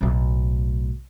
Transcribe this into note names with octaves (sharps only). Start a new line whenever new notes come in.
B1 A2